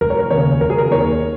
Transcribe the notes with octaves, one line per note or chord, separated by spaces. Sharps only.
F1 A#4
C#5
A#4
D#2 C#3 C#5
F1 A#4
G#4
A#4
D#2 D#3 C#5